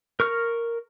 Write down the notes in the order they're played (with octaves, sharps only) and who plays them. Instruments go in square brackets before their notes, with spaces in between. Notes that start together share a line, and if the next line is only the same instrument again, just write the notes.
[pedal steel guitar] A#4 C#6 F6